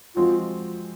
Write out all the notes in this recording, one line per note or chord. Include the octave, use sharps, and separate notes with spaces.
F3 G#3 C4 F4 F#4